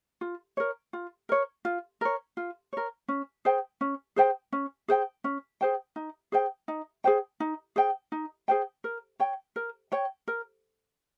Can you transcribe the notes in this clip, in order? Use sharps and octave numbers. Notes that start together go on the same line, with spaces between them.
F4
A#4 C#5
F4
A#4 C#5
F4
A#4 C#5
F4
A#4 C#5
C#4
G#4 C5 G5
C#4
G#4 C5 G5
C#4
G#4 C5 G5
C#4
G#4 C5 G5
D#4
G#4 C5 G5
D#4
G#4 C5 G5
D#4
G#4 C5 G5
D#4
G#4 C5 G5
A#4
C#5 G5
A#4
C#5 G5
A#4